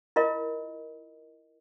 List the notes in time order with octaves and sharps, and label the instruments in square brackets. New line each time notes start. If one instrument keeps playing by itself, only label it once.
[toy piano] E4 F4 A#4 D#5